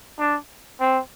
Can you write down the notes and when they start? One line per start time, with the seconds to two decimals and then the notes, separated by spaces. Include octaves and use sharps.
0.19 D4
0.80 C4